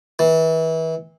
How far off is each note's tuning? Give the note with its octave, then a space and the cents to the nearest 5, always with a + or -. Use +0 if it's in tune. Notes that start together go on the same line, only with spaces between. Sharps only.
E3 -30